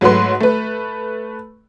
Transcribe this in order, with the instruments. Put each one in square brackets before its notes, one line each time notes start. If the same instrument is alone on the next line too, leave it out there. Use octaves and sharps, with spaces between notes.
[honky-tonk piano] G#2 F#3 A3 F#4 B4 C6
A3 B4